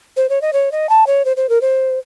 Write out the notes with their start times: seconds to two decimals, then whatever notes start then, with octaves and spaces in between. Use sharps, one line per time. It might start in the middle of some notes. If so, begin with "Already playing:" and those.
0.17 C5
0.29 C#5
0.42 D#5
0.53 C#5
0.72 D#5
0.89 A5
1.07 C#5
1.25 C5
1.37 C5
1.49 A#4
1.61 C5